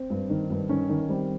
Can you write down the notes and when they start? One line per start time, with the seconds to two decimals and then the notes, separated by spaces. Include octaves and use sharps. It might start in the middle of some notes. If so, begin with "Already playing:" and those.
Already playing: C4
0.10 G2
0.30 D#3
0.50 G2
0.69 D#3 C#4
0.89 D#3
1.09 G3 C4